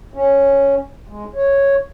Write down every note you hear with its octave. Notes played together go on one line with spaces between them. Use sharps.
C#4
G#3
C#5